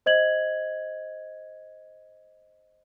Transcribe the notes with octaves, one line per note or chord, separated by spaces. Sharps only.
C5 D#5 G#6 F#7